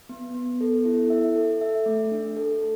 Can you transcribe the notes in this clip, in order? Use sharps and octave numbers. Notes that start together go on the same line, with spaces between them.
B3
B3
A4
E4
E5
A4
E5
A3
D4
A4